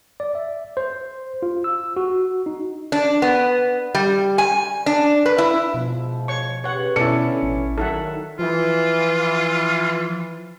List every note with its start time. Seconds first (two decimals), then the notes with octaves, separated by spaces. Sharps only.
0.20 D5
0.35 E5
0.77 C5
1.43 F4
1.64 E6
1.97 F#4
2.46 D#4
2.92 D4
3.22 B3
3.95 G3
4.38 G#5
4.86 D4
5.26 B4
5.38 E4
5.74 G#2 B2 F3
6.28 C#5 C#6
6.64 C#3 G4 B4 C#5 F#5
6.96 B2 D3 B3 C#4 E4 A4 D5 C#7
7.43 A1
7.78 D#3 F#3 D#4 A4 E5 F#5
8.39 E3 F3 F4